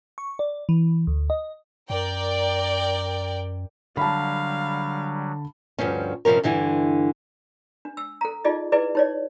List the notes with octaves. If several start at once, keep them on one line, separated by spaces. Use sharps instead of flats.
C#6
D5
E3
D2
D#5
F#2 A#4 D5 G5
D3 F#3 G3 F5 A5 B5
D2 G2 F3 C#4
G2 C3 F3 C#4 A#4
G2 D3 E3 E4
D4
E6
A4 A#5
D#4 F4 G#4 D5 D#5
E4 G#4 B4 D5
D#4 C#5 D5